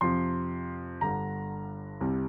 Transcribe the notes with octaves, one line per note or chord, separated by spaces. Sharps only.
F2 C3 F3 C6
G1 G2 D3 A#5
C2 C3 G3